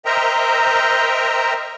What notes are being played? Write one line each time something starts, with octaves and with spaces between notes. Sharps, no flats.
A#4 C5 D#5 E5 G5 A#5